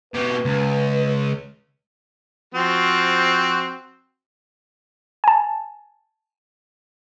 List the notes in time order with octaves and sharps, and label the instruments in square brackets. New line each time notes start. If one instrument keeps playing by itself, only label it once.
[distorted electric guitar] B2 G4 [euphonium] B4
[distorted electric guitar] C#2
[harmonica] F3 C4 F#4
[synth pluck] G#5 A5